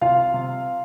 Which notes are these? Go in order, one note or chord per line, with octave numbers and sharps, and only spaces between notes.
C3 F4 F5
C3